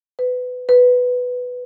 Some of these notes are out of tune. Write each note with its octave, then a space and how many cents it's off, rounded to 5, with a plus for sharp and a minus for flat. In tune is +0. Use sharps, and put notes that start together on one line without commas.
B4 +20
B4 +5